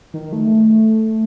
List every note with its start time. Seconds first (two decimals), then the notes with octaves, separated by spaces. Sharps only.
0.14 D#3
0.33 A3